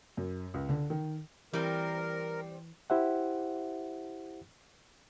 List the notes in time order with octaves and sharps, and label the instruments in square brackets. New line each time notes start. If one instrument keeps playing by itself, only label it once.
[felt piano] F#2
C#2
D3
D#3
[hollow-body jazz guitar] E3 [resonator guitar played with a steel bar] G3 C4 [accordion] A#4
[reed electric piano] E4 G4 C5 E5 F#5